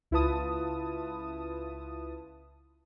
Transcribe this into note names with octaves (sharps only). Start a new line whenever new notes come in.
C#2 E4 F4 B4 A5 D#6